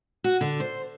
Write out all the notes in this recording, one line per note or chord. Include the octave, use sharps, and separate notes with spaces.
F#4
D3
C5